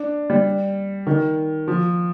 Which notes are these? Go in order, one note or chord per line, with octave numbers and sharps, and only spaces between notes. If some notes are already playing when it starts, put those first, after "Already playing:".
Already playing: D4
G3
D#3
F3